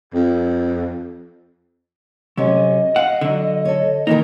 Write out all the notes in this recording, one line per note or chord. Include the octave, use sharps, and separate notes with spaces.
F2
C3 F#3 A3 C#4 D#5
F5 F#5
D3 F#3
A4 C#5
D#3 E3 A#3 D#4 A#4